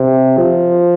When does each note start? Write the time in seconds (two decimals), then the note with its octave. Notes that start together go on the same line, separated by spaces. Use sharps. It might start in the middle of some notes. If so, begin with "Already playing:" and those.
Already playing: C3
0.37 F3